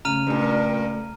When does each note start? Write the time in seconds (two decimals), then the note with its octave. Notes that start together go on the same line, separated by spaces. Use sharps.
0.05 C#3 A3 A#5 F6 D#7
0.27 G2 A#2 A3